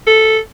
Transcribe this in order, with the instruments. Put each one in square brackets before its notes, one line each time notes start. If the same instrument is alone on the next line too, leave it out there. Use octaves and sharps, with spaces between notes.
[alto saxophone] A4